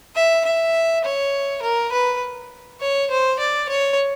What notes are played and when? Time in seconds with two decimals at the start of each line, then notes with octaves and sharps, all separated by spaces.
0.16 E5
0.45 E5
1.04 C#5
1.63 A#4
1.92 B4
2.81 C#5
3.10 C5
3.39 D5
3.69 C#5